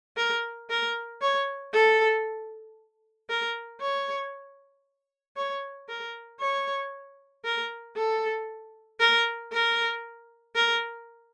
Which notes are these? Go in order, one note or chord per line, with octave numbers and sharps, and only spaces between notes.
A#4
A#4
C#5
A4
A#4
C#5
C#5
A#4
C#5
A#4
A4
A#4
A#4
A#4